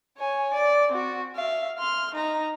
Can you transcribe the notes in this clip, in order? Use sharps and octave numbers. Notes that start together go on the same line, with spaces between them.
C#5 G#5
D5
C4 F#4
E5 F5
C6 F6
D#4 A#5